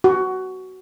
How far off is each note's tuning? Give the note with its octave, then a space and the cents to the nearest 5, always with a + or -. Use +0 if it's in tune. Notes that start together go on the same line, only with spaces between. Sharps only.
F#4 +15